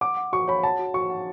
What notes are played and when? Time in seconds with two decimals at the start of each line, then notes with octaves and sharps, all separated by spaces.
0.01 F#5 D6
0.17 F#5
0.33 F#4 C#6
0.48 C#5 B5
0.63 F#5 A5
0.79 F#4
0.94 F#4 C#6
1.10 F#5